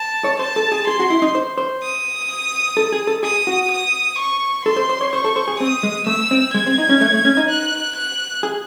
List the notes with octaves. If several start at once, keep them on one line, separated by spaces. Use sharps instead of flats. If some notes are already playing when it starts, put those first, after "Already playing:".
Already playing: A5
C#5
C5 A5
A4
G#4
G#4 C6
F#4
E4
D#4
C5
C5
D#6
A4
G#4
A4
G#4 D#6
F#4
D#6
C#6
A4 C6
C5
C5
C#5
C5 C#6
A4
C5
G#4
C4 D#6
G#3
A3 E6
C4
G#3 G#6
C4
D#4
C#4
A3
A3
C#4
D#4
F#6
F#6
G#4